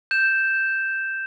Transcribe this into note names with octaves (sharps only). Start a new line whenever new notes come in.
G6 E7